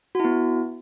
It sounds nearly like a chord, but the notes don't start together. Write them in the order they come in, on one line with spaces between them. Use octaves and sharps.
F#4 E4 B3